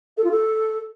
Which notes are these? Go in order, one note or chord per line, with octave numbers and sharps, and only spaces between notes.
A4
F4
A4